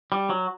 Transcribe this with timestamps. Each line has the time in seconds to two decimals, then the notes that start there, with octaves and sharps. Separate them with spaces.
0.12 G3
0.30 F#3